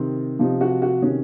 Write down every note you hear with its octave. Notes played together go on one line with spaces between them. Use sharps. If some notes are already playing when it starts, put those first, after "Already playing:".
Already playing: C3 D#3 C4
C3 F3 D#4
F#4
F#4
C3 D#3 C#4